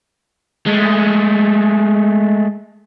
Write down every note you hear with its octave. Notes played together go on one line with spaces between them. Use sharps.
G#3 A3